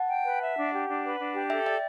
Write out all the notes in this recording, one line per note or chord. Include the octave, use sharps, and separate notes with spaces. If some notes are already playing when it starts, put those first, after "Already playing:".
Already playing: F#5 A5
G5
B4
E5
D4
G4
D4
B4
D4
G4
A4 E5 G5
D5 E5 G5